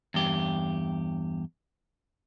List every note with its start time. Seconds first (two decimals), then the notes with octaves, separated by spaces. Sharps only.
0.14 E2 G2 G4